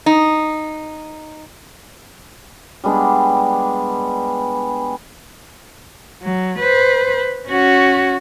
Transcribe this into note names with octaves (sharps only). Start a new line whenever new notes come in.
D#4
G3 G#3 B3 D4
F#3
B4 C5
C#4 F#4